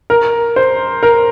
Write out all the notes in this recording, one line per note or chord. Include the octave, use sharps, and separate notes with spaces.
A#4
C5
A#4